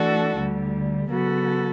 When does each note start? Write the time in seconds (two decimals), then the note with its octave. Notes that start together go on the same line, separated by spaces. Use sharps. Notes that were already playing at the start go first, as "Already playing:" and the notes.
Already playing: E3 A3 D4 F#4 A4
0.36 D2 D3 G3
1.10 C#3 F#3 B3 F#4 A4